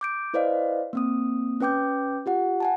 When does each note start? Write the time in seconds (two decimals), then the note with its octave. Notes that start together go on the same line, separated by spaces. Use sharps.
0.01 D6 G6 D7
0.34 E4 B4 C5 D5 D#5 F5
0.93 A#3 C4 D#6
1.60 C#4 B4 G5 D6 G6
2.26 F4 G4 F#5
2.60 F#5 G#5 A5